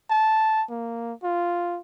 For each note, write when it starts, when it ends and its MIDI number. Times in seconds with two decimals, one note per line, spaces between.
0.10 0.64 81
0.70 1.13 58
1.23 1.80 65